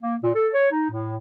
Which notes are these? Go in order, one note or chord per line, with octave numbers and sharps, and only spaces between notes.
A#3
A#2
A4
C#5
D#4
A2